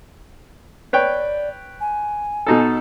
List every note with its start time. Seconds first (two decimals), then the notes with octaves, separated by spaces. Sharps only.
0.93 B4 C#5 D5 G5
1.81 G#5
2.46 B2 D#4 A4